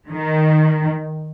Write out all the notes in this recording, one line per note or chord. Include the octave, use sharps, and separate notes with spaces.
D#3